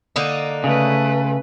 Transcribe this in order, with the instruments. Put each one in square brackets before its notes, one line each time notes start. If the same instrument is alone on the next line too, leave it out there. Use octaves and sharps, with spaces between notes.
[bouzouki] D3 A#3 D#4
[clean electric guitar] C#3 [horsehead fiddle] A3 B4